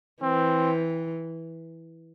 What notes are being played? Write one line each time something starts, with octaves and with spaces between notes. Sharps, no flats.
E3 C4